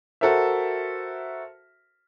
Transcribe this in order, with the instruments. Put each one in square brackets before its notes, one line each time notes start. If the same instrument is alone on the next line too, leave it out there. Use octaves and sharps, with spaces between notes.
[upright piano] F#4 A4 A#4 C5 E5